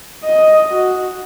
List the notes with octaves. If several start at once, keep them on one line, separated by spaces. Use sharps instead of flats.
D#5
F#4